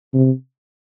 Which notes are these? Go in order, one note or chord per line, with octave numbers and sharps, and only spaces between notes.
C3